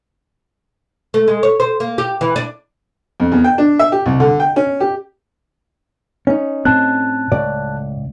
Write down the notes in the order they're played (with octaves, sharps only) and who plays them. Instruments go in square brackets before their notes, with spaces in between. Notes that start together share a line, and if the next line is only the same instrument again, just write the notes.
[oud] A3
G#3
C#5
C5
A#3
G4
E3
D4
[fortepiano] F2
E2
G5
D4
E5
G4
C2
D3
G5
C#4
G4
[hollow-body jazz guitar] C#4 D#4
[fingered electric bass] A2 C4 [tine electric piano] A5 F#6
[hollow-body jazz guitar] C#2 D5 [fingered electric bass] A2